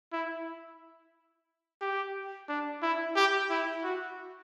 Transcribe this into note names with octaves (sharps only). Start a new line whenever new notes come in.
E4
G4
D4
E4
G4
E4
F#4